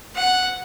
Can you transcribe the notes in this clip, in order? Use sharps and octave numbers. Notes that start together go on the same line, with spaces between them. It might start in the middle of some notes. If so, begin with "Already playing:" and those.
F#5